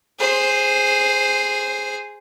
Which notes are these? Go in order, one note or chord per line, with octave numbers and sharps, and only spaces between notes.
G#4 C5